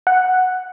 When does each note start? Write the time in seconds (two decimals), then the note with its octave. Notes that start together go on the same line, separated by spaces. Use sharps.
0.07 F#5